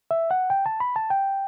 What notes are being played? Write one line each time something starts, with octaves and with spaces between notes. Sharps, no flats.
E5
F#5
G5
A5
B5
A5
G5